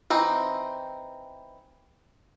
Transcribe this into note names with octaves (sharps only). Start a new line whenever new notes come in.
E3 C4 D#4